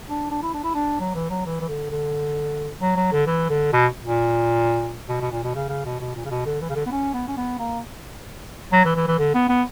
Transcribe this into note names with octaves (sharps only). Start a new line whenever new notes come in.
D4
D4
E4
D4
E4
D4
F#3
E3
F#3
E3
E3
D3
D3
F#3
F#3
D3
E3
D3
B2
A#2
B2
B2
A#2
B2
C#3
C#3
B2
B2
A#2
C#3
B2
D3
E3
C#3
D3
B3
C#4
B3
C#4
B3
A#3
F#3
E3
E3
E3
D3
B3
B3